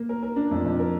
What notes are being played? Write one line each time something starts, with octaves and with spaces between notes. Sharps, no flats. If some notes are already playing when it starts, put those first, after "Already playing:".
Already playing: A#3
A#4
A#4
D4
F2
F2
A#4